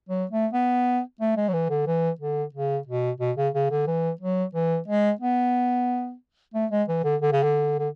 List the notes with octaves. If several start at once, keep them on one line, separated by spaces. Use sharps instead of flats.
F#3
A3
B3
A3
G#3
F#3
E3
D3
E3
D3
C#3
B2
B2
C#3
C#3
D3
E3
F#3
E3
G#3
B3
A3
G#3
E3
D3
D3
C#3
D3
D3